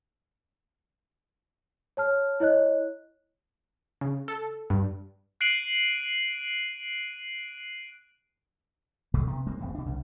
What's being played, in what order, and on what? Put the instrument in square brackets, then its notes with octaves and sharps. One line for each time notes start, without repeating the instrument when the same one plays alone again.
[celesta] C#5 A5 F6
E4 C#5 D#5 F#6
[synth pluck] C#3
A4
G2
[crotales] F#6 C7 D7 D#7 F#7
[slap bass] D1 B1 B2 A3
C3 B3
G3 G#3 A#3 C4
D1 B1 A2 C4
B2 D4
C2 C#3